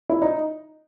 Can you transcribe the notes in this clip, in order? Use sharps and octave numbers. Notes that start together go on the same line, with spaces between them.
E4
D#4